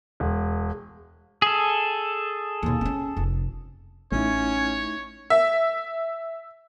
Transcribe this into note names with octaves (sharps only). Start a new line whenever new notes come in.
E1
G#4 A4
D#2 B2
C4 C#4
F1
A1 A3 C#4 D#4 E4 C#5
E5